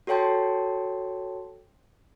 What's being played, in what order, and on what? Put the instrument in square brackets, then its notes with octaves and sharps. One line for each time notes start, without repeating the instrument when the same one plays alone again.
[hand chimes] F#4 A4 C#5 G5 A5 C6